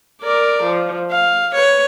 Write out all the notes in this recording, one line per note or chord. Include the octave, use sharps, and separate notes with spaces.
A#4 D5
F3
F5
B4 C#5